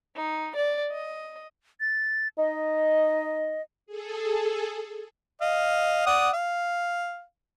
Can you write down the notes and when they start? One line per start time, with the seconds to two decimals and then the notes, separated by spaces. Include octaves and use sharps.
0.16 D#4
0.56 D5
0.91 D#5
1.80 A6
2.38 D#4 D#5
3.86 G#4 A4
5.41 D#5 F5
6.06 D5 F#5 D#6
6.33 F5